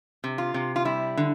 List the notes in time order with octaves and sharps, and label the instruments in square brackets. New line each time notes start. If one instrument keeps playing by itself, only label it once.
[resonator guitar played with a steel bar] C3
F4
C3
F4
G3 E4
D3